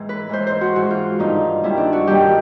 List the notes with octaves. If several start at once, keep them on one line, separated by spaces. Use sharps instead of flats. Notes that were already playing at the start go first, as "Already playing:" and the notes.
Already playing: G#2 E3 G#3
B4
G#2 E3 G#3 C5
C5
F#4
G#2 E3 G#3 F#4
F4
G2 D#3 G3 D#4
G2 D#3 G3 E4
D4
F#4
G2 D#3 G3 G4